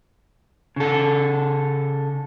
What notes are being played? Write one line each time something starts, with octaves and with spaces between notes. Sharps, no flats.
C#3 A4